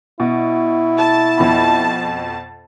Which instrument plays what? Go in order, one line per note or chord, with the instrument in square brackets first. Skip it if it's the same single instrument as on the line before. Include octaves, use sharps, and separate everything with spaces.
[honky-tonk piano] B2 [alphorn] E4
[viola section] A5
[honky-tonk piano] F2 B2 B5